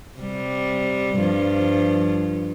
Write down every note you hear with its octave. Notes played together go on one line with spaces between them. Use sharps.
C3 G3
G2 F3